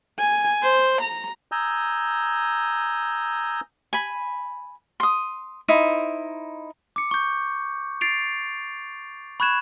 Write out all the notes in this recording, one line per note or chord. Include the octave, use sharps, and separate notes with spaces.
G#5
C5
A#5
G#5 A#5 D#6 E6 G6
G#5 B5
C6 D#6
D#4 E4 C5
D6 C#7
C#6 G6
A6 C7 D7 F7
B5 C#6 F#6 G#6 E7